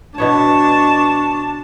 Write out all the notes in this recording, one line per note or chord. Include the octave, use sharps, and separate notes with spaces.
B2 B3 D4 C#5 A5 C#6